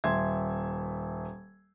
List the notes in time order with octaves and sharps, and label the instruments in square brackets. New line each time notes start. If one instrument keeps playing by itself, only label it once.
[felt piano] D#1 E5 C6 G#6